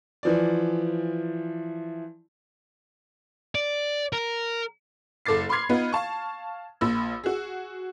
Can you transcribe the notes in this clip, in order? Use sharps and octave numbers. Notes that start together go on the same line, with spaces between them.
E3 F3 D5
D5
A#4
F#1 A4 D6 A6 C7
B5 C6 D6 F6 G#6 C7
B3 D#4 F4 B4
F5 A5 C#6
A#1 A#2 B5 E6
F#4 G#4